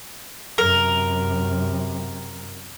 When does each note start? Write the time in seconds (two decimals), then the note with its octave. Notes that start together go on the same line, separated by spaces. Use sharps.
0.58 F#2 C3 A#4